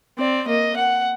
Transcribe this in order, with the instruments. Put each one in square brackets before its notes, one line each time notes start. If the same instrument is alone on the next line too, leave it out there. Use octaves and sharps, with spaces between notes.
[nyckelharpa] C4 [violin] D5
[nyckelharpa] A#3 [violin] D#5
[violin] F#5